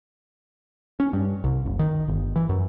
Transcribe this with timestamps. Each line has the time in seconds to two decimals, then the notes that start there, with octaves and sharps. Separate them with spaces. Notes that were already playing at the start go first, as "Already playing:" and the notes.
1.00 C#4
1.13 G2
1.44 C2
1.66 F#1
1.79 D#3
2.08 G1
2.36 E3
2.49 F#2